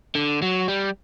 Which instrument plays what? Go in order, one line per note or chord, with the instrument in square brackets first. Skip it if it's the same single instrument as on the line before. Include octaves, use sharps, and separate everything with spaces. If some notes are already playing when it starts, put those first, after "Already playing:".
[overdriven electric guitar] D3
F#3
G3